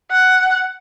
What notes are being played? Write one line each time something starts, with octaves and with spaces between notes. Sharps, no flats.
F#5